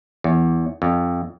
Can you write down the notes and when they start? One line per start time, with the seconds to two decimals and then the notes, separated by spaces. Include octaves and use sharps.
0.24 E2
0.82 F2